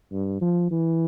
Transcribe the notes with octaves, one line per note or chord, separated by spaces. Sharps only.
G2
F3
E3